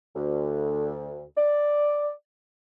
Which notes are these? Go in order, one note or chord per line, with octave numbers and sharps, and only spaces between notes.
D2
D5